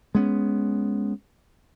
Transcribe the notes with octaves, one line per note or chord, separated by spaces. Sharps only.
G#3 B3 C#4